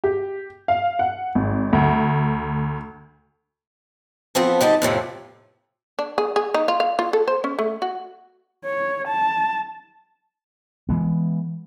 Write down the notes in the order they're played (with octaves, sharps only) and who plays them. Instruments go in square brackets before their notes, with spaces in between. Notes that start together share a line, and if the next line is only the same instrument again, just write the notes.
[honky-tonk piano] G4
F5
F#5
G#1
D2
[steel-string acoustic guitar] F3 B3 C4 A4
D3 G3 D#4 A5
F2 A2 C3 F3
[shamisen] D4
G#4
G#4
D#4
F4
F5
F4
A4
C5
C#4
A3
F#4
[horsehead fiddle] C#5
A5
[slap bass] E3 G#3 B3